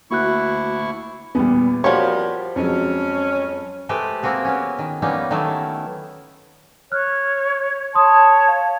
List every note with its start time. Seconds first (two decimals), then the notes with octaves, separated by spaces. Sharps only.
0.11 D2 A#3 E4 F#4 C#6 F#6
1.35 E2 A#2 G3 B3
1.84 F2 F3 G3 F#4 G4 A#4 C#5
2.56 F2 F#3 G#3 C#4
3.89 G#3 A3 G4 B4 C5
4.23 A#3 C4 F#4 G#4
4.45 B3 C#4
4.79 D#3
5.02 G3 A#3 B3 C#4 D#4
5.31 D#3 F#3 A3 B3 E4
6.92 C#5 F6 F#6
7.95 C#5 A5 C6 D#6
8.48 F5